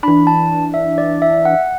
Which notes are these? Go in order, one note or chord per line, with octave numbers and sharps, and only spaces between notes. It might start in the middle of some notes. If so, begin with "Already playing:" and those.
E3 D4 B5
A5
E5
D5
E5
F#5